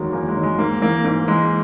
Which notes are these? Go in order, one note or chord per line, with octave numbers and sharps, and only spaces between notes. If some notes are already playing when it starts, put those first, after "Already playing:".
Already playing: E2 D#3 F#3 G#3 A#3
E2 A#3
G#3
D#3 F#3
G#3
G#2 A#3
E3 A#3
G#2 A#3
E3 G#3